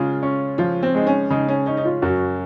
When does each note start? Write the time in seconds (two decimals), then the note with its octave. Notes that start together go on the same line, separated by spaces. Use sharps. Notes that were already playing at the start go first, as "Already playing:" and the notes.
Already playing: C#3 G#3 F4
0.23 C#4
0.58 F3 F4
0.83 C4
0.95 G#3 D#4
1.07 C#4
1.30 C#3 D#4
1.48 C#4
1.66 C#4 D#4
1.77 D#4
1.85 F4
2.02 F#2 F#4